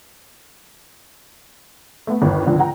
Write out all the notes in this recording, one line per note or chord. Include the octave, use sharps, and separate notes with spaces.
A3 B3
G1 D#2
G#1 C#2 D3 F3
F#5 G5 A#5